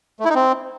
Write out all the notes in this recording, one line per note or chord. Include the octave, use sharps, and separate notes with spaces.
A3
E4
D#4
C4